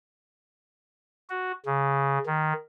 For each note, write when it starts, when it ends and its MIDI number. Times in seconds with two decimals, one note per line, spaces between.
1.30 1.52 66
1.66 2.19 49
2.26 2.53 51